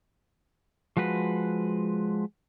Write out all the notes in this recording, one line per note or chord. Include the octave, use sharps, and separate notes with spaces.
F3 G#3 F#4 B4